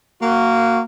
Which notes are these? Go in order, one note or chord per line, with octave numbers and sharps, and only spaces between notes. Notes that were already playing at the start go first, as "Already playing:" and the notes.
A#3 F#4